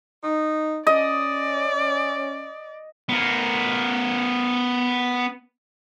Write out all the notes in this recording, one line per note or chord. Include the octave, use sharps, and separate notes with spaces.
D#4
C#4 D5 D#5
B3 A#4